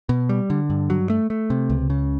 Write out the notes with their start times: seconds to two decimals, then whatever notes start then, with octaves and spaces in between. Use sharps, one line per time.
0.09 B2
0.29 G3
0.50 D3
0.70 G2
0.90 F#3
1.10 A3
1.30 A3
1.50 C3
1.70 C#2
1.90 C#3